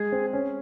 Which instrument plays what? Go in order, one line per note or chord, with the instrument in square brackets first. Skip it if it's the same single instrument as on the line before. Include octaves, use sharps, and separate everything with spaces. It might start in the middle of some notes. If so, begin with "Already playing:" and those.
Already playing: [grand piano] G#3 [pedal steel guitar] G#4
[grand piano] C4
C#4